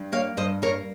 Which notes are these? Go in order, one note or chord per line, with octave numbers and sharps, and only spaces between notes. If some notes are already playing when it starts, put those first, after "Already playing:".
Already playing: G2
A#3 C#5 F5
G2 C5 D#5
A#3 A#4 C#5